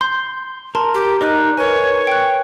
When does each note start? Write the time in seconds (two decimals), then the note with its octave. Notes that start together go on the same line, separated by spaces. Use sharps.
0.01 C6 G6
0.75 A#4 A5 C6
0.94 G4
1.21 D#4 A#4 D5 D#5 F#6
1.57 A#4 B4 C#5 G#5
2.07 G5 F#6